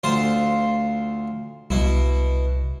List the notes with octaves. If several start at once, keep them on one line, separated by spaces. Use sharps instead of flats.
D2 F4 C5
C2 B2 E4